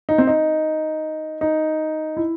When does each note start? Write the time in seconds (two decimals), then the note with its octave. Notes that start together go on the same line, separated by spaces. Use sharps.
0.09 D#4
0.18 C4
0.27 D#4
1.41 D#4
2.17 E4